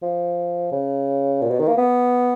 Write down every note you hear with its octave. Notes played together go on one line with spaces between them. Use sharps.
F3
C#3
A#2
B2
D#3
A#3
B3